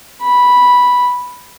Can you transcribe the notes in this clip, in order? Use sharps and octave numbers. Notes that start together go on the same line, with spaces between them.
B5